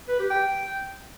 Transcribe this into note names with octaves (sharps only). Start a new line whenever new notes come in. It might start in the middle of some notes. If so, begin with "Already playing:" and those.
B4
G4
G5